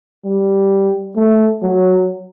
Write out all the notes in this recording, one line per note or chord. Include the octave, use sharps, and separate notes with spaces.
G3
A3
F#3